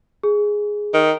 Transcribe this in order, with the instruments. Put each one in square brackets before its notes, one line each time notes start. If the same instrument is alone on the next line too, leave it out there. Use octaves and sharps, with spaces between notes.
[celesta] G#4
[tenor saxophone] D#3